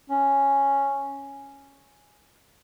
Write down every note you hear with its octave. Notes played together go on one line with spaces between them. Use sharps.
C#4